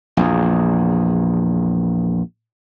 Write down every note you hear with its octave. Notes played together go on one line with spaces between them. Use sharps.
A#1 E2